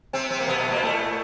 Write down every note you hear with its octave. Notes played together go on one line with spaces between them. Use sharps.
C3 C4
C3 C4
A#3
B2 B3
B2 B3
A#2 A#3
A2 A3